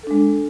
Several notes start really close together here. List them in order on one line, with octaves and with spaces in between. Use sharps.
A4 D4 G#3